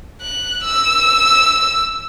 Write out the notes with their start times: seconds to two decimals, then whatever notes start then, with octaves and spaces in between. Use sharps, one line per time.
0.21 F#6
0.64 E6